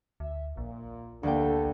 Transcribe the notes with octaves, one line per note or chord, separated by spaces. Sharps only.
D2 E5
A#1 A#2
D2 A#3 B3 D4 G4 A4 G5